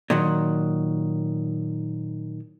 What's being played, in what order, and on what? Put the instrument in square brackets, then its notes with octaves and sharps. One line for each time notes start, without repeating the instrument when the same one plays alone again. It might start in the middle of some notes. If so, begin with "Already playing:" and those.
[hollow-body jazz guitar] A#2 D#3 F#3